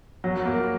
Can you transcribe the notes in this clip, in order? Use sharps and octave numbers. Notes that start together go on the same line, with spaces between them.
F#3
A#3